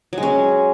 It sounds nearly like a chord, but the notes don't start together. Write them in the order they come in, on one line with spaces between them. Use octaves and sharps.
F#3 G#3 C#4